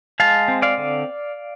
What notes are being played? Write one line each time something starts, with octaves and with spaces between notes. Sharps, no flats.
G#3 F5 A5
C4
D5 F5
D3